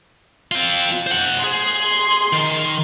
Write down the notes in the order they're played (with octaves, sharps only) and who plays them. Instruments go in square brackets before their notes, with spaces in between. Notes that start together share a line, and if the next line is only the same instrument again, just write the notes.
[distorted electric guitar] C4 F4
C5 F#5
[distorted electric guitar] G#4 [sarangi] C6
[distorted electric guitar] D#3